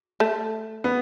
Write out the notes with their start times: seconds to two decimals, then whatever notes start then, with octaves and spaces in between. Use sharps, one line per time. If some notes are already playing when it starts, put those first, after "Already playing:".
0.20 A3
0.84 B3